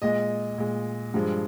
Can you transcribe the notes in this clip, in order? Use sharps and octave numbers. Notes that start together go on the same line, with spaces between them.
A#2 G#3 D#5
A#2 G#3
G2 F3 G#3